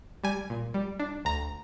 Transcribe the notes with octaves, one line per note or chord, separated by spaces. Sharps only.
G3 G#5
A#2
G3
D4
D2 A#5